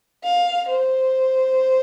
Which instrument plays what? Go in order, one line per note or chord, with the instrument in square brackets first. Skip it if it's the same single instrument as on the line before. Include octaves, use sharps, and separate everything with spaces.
[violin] F5
C5